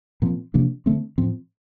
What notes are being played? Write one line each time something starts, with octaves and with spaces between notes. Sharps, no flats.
A#2 F3 C4
C3 F3 A#3 D4
D3 A3 C4
A2 F3 C4